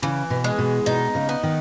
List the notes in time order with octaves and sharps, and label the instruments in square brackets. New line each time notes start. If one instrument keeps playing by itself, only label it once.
[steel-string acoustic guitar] C#3 [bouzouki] E3
[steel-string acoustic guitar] B2
[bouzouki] G#3
[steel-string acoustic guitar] B2
[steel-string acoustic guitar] B2 [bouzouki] D#4
[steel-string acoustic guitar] C#3
[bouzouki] B3
[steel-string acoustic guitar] D#3